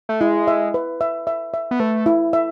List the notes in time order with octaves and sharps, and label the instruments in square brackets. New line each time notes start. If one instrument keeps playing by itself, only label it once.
[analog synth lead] A3
[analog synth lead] G#3 [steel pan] E4
[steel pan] E5
B4
E5
E5
E5
[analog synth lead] B3
[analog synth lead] A3 [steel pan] B4
[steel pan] E4
E5